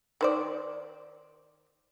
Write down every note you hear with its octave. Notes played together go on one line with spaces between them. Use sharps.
D#3 C5 D5